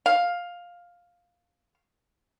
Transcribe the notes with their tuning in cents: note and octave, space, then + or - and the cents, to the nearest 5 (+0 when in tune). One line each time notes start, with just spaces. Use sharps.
F5 +10